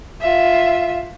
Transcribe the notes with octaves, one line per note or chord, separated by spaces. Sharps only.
F4 E5